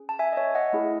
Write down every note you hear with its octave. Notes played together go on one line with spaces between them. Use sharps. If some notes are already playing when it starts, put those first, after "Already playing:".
Already playing: C#4 G#4
A5
E5 G#5
D#5
C#5 E5
D#5 F#5
A3 E4 G#4